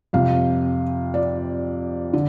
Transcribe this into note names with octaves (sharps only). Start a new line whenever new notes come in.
F2 C3 F5
D5
D3